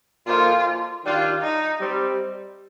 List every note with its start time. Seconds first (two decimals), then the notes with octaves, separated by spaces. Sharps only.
0.27 A#2 F3 A#3 D#4 F4 A4
1.04 D#3 G3 D4 F4
1.42 D#4
1.81 G3 C4